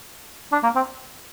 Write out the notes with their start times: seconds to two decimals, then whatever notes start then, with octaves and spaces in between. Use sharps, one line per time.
0.52 D4
0.63 A#3
0.75 C4